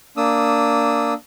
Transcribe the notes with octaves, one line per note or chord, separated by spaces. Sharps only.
A#3 D4 D#6 E6